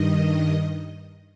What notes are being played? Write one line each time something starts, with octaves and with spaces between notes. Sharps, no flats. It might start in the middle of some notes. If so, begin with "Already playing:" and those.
Already playing: G2 D#3 D#5